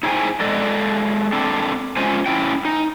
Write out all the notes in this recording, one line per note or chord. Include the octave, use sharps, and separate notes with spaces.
D#4 E4 G#4 C5 G5 G#5
G#3 A4 D5 D#5
C4 D4 A4
G#3 C#4 F4 C5 G#5
C#4 E4 G5
D#4